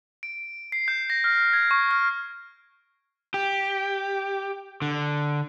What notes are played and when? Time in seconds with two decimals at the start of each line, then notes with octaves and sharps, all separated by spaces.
0.23 D7
0.72 C7
0.88 G6
1.10 A#6
1.24 F6
1.53 G#6
1.71 C#6
1.91 F6
3.34 G4
4.82 D3